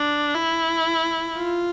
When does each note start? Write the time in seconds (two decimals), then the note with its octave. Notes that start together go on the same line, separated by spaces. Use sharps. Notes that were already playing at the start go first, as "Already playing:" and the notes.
Already playing: D4
0.35 E4
1.36 F4